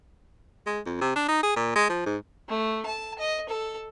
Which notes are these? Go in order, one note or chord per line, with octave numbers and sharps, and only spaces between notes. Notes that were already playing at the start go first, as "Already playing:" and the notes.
G#3
F2
C3
D4
D#4
G#4
A#2
G#3
F3
G#2
A3
A5
D#5
A4